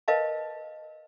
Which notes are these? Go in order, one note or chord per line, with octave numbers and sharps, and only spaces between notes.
A#4 B4 D#5 F5 A5